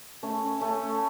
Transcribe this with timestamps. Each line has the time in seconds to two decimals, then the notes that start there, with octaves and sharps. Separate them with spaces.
0.23 A3 C#4
0.61 A3 C#4